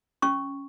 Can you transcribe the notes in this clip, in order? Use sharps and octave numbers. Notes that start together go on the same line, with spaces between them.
C#4 C#6